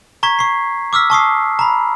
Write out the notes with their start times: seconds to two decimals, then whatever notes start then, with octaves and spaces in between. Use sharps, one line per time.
0.23 A#5 C#6 G#6 B6
0.39 C#6 C7
0.93 D6 E6 F6 B6
1.10 A5 C#6 D#6 C7
1.59 A#5 B5